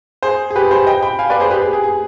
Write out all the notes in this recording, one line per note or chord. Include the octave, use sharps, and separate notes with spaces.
G#4 C5
G#4
G4 B4
G#4 C5
D#5 G5
G5 B5
F5 G#5
B4 D5
G#4 C5
G4 B4
G#4
G#4
G#4